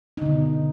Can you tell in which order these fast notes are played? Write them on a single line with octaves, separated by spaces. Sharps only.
D#4 D3 B2